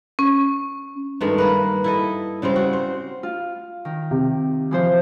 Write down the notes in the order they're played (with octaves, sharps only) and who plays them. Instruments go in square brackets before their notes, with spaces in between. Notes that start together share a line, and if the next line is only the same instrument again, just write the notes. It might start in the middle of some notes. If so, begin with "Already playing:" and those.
[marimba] C#4
[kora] G2 D#3 G#3 A3
A#3 B4
E4 A4 D#5
C#3 G3 G#3 C4
F#4
C5
[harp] F4
D#3
[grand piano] C3
[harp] E3 F3 C5